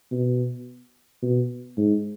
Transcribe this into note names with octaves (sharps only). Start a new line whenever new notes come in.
B2
B2
G#2